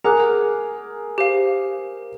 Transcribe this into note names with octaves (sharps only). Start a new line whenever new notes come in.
G#4 A#4 F#5 A#5 D6 F#6
G4 C5 F5